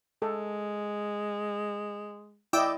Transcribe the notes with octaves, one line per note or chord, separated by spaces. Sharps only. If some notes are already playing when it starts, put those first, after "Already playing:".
G#3 A4
E4 D5 D#5 G5 D6 E6